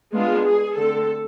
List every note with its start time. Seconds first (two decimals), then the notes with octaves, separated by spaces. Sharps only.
0.13 G#3 B3 D4 F4
0.45 G#4
0.76 D3 A3 C4 A4